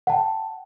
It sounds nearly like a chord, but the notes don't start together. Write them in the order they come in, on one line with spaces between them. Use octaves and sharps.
F#5 A5 G5